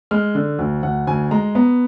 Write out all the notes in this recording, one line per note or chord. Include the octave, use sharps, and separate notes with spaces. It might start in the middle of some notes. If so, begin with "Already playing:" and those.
G#3 F6
D3
D2
D2 F#5
D2 G#5
G#3 A#5
B3 A#5